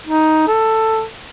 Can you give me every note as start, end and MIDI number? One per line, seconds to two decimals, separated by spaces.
0.07 0.47 63
0.48 1.04 69